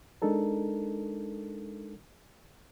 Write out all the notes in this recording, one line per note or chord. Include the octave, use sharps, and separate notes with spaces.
G#3 D4 D#4 A4 A#4